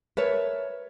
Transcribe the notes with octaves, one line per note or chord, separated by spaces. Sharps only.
A#4 B4 C#5 E5 A5